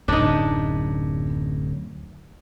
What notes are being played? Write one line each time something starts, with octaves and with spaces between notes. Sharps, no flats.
D1 F#2 D4 D#4